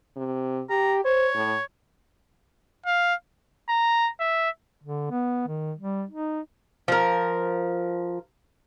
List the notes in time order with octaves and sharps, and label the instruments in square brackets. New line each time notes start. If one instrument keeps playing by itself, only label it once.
[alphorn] C3
[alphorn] G4 [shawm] A#5
[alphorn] C5 [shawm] C#5
[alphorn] A2
[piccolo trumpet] F5
A#5
E5
[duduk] D3
B3
D#3
G3
D#4
[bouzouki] F3 A#4